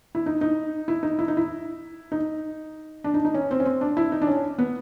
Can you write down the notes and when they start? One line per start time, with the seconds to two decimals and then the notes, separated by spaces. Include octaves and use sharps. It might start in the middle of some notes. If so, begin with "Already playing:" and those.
0.15 E4
0.26 D#4
0.41 D#4
0.88 E4
1.03 D#4
1.19 E4
1.28 D#4
1.37 E4
2.12 D#4
3.04 D4
3.14 D#4
3.25 D#4
3.34 C#4
3.51 C4
3.60 C#4
3.65 C4
3.81 D4
3.97 E4
4.12 D#4
4.22 D4
4.27 C#4
4.58 B3